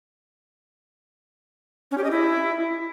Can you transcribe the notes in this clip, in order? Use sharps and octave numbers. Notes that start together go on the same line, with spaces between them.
C#4
G4
D#5
E4